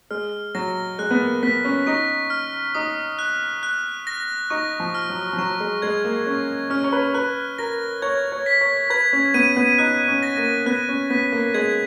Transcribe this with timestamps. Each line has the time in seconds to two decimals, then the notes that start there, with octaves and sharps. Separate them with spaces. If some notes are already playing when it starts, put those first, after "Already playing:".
0.11 G#3 F6
0.55 F#3 A#6
0.99 G#3 F#6
1.11 B3
1.21 A#3
1.43 B3 B6
1.65 C#4
1.87 D#4 C#6
2.30 F6
2.75 D#4 D#6
3.19 F#6
3.63 F#6
4.07 A#6
4.50 D#4 C#6
4.80 F3
4.95 F6
5.10 F#3
5.33 F3
5.38 F#3 C#6
5.60 G#3
5.82 G#3 G#6
6.04 A#3
6.26 C#4 C#6
6.70 C#4 F6
6.84 C#5
6.92 B4
7.14 B4 F#6
7.58 A#4 A#6
8.02 C#5 G#6
8.32 C#5
8.46 B6
8.61 C#5
8.90 B4 G#6
9.13 C#4
9.34 B3 D#7
9.56 B3
9.78 D#4 F#6
10.08 C#4
10.23 A#6
10.37 A#3
10.66 B3 F#6
10.89 C#4
11.10 B3 B6
11.32 A#3
11.54 G#3 G#6